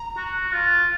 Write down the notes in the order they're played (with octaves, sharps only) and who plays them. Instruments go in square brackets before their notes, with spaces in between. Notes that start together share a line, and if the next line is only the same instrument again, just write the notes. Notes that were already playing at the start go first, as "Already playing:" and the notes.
Already playing: [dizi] A#5
[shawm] F#4
F4